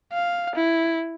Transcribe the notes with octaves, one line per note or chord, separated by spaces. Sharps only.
F5
E4